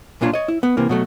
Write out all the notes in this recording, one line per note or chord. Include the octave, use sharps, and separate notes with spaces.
B1 A#2 D4 F4 C#5
C#5 D#5
E4
B3
C3 E3 A#3
B2 F#3 A3